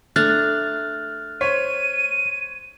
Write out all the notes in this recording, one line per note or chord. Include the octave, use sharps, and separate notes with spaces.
A3 D4 A#5 F6 F#6 A6
C5 C#5 B6 D#7